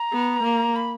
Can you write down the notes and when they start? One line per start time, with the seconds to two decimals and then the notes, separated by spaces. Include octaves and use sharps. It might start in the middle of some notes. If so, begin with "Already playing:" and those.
Already playing: A#5
0.12 B3
0.44 A#3
0.76 B5